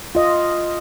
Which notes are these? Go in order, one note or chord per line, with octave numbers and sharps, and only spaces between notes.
F4 D#5